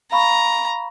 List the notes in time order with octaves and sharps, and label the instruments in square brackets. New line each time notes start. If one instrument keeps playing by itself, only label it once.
[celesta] F5 B5 C#6 [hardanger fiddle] A#5